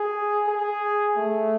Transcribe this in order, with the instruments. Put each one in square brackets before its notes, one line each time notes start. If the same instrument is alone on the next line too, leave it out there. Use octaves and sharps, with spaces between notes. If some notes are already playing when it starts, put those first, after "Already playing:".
Already playing: [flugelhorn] G#4
G#4
A3